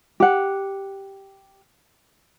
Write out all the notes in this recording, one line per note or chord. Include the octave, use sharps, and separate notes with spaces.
G4 F#5